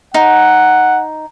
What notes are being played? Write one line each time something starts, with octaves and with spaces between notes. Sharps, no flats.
D#4 F#5